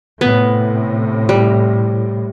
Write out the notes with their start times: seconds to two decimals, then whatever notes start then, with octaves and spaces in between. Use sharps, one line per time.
0.21 A2 C3 B3
1.29 G3